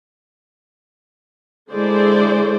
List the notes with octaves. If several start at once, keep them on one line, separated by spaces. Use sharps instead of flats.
D3 G#3 E4 G#4 C5 D5